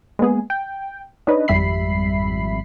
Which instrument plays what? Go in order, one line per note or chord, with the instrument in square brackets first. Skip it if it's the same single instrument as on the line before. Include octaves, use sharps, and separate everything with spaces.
[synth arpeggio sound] G#3 A#3 B3 G#4
G5
D4 D#4 B4 C#5 D#5
G#1 F2 G3 E5 B5 C7